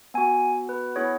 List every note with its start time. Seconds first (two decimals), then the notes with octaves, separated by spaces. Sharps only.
0.14 B3 F#4 G#5
0.69 B4
0.96 B3 E4 G#4 C#5